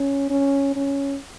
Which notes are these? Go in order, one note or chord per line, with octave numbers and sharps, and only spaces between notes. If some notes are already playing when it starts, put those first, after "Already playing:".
Already playing: C#4
C#4
C#4